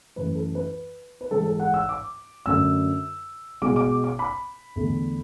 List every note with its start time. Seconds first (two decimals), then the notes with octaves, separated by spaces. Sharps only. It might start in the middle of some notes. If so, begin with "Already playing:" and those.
0.16 F#2 E3 A3 B4
0.35 A4
0.55 B4
1.21 B4
1.31 G#2 E3 G#3 A4
1.46 A4
1.60 F#5
1.74 E6
1.89 D6
2.46 F#2 D3 A3 E6
3.62 B2 G#3 D6
3.76 D6
4.04 D6
4.19 B5
4.76 E2 D3 A3